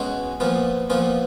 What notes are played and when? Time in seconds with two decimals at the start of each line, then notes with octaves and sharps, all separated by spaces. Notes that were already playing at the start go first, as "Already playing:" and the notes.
Already playing: B2 G#3 C#4 F#4
0.40 A#2 F3 B3 F4
0.90 A#2 F3 B3 F4